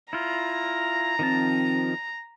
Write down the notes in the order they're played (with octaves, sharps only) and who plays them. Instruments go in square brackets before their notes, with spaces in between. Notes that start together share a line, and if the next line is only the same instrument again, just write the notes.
[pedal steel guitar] E4 F4 [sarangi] A#5
[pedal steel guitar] D#3 F3 A5 [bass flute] C4